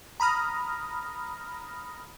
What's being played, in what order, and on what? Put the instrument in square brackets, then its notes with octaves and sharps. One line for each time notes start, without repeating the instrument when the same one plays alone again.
[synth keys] A#5 B5 D#6 F6 A#6